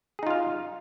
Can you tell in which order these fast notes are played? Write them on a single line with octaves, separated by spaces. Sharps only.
G#4 D#4 F4 F5